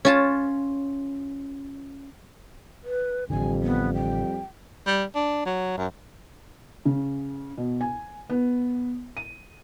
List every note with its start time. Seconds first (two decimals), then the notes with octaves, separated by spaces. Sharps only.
0.05 C#4 F4 A5
2.84 B4
3.30 A1 F2 D3 G3 G#5
3.62 B3
3.94 G5
4.87 G3
5.15 D4
5.46 F#3
5.77 F#2
6.85 C#3
7.58 B2
7.81 G#5
8.30 B3
9.17 D#7